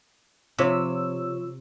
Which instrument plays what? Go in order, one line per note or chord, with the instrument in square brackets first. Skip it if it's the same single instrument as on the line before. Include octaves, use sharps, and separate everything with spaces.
[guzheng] C3 [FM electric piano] F3 C#5 E6